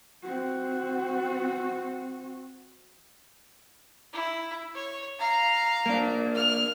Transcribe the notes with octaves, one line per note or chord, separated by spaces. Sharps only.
C4 F#4
E4
C#5
F5 A#5
A#3 D4
F6